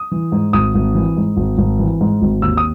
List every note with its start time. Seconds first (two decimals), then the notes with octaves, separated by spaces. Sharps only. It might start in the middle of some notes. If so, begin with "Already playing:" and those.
Already playing: D#6
0.12 E3
0.32 G#2
0.53 G#1 D#6
0.75 G#1
0.95 E3
1.17 G#2
1.37 G#1
1.58 G#1
1.79 E3
2.01 G#2
2.22 G#1
2.42 D#2 E6
2.57 D#6